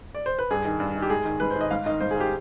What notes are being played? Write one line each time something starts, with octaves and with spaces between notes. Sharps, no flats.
D5
C5
B4
G2 G#4
D#3
G2
D#3
G4
G#2 G#4
D#3
G#2 B4
C5
D#3 D#5
G#2 F5
D#3 D#5
G#2 C5
G#4
D#3 G4